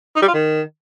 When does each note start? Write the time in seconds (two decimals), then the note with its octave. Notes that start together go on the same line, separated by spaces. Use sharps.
0.16 D#4
0.22 G3
0.28 F4
0.34 D#3